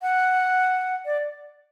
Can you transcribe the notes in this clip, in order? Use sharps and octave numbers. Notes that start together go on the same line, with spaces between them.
F#5
D5